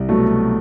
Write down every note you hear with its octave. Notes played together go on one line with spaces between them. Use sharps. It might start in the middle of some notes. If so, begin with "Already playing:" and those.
Already playing: C2
B2 F#3 A3